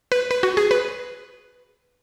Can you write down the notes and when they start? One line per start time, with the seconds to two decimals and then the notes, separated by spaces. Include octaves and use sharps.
0.12 B4
0.31 B4
0.43 F#4
0.57 G#4
0.71 B4